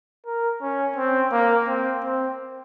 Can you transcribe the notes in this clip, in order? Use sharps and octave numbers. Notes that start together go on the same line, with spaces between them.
A#4
C#4
C4
A#3
C4
C4